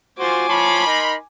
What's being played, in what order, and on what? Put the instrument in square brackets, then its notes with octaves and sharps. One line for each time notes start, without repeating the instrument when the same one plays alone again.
[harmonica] F4 F#4 C5 [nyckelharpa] G#5 D6
[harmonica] F3 C#5 A5 [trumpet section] B5 C6
[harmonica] D#4 A#4